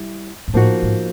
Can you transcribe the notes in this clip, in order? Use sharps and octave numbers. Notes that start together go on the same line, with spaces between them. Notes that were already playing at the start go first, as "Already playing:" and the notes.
Already playing: G3 E4
A#2
A2 F3 A#3 D#4 F#4
G#2